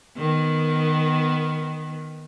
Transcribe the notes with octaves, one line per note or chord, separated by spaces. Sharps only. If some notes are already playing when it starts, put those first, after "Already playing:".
D#3 B3